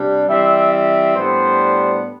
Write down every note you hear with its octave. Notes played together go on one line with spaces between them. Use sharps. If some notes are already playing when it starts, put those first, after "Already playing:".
Already playing: C3 G3 D4
E3 G3 C4 E5
E5
A2 G3 B3 D4 C5